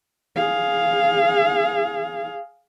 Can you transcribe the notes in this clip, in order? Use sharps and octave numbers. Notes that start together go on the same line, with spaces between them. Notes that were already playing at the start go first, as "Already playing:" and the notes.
G#4 F5